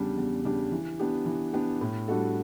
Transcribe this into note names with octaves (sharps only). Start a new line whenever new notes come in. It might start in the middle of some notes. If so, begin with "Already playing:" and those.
Already playing: E2 C#3 G3 D4 G4
E2
C#3 G3 D4 G4
E3
B3 D4 G4
E3
B3 D4 G4
A2
G3 D4 F#4 A4